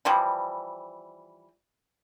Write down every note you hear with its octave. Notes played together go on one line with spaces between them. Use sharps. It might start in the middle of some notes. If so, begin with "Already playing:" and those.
E3 F3 G3